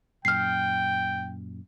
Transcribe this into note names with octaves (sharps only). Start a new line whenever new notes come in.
F#2 A#2 G5 F6 C7